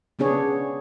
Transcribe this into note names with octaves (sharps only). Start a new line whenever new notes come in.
C#3 B3 D4 G#4 C#5